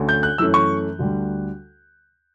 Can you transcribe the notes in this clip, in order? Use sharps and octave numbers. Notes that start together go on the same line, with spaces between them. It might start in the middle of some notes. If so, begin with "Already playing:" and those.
Already playing: D2 D3 A3 C#4
G6
F#6
F#2 E3 A3 C#4 E6
C#6
D2 D3 G3